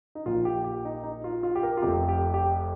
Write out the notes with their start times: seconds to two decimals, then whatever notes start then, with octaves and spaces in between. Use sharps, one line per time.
0.15 D#4
0.25 A#1 A#2 F3 F4
0.45 G4
0.64 G4
0.85 D#4
1.04 D#4
1.24 F4
1.43 F4
1.55 G4
1.63 A#4
1.77 F4
1.82 F1 F2 C3 G4
2.09 G4
2.34 G4